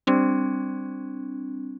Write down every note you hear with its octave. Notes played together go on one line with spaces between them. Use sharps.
G3 C4 D4